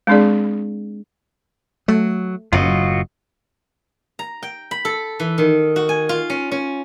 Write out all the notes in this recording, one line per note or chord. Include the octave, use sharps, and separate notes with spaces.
G#3 C4 D4 G#4 D5
F#3 A3
F#1 F#2 A2 F4 F#4 D#5
A#5
G5
B5
A4
E3
D#3
F#4
G#5
F4
C#4
C#4